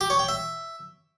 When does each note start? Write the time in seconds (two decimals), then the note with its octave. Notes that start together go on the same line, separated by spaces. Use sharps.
0.01 G4
0.10 C#5
0.19 G5
0.29 E5